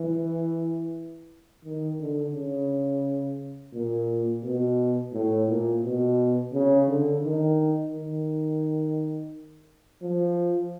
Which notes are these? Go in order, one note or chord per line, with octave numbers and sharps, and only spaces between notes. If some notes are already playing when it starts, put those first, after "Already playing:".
Already playing: E3
D#3
D3
C#3
A#2
B2
A2
A#2
B2
C#3
D3
D#3
D#3
F3